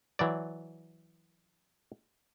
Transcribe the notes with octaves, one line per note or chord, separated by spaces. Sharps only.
E3 F#3 D5